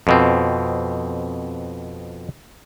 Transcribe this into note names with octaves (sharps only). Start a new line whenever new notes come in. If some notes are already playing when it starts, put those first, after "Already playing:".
F2 B2 C4